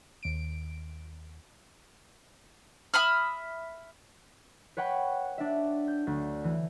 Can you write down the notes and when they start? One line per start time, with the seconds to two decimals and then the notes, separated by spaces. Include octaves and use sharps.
0.23 D#2 D7
2.94 E5 B5 D#6 F6
4.77 B4 C#5 F#5 G5 B5
5.38 D4 E5
5.88 G6
6.07 D2
6.44 E3